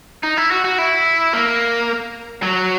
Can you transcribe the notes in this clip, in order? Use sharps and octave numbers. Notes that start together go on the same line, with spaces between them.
D#4
E4
F#4
F#4
E4
A#3
F#3